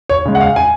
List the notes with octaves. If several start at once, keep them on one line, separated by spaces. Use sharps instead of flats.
C#5
C#3 G#3
F#5
F5
G#5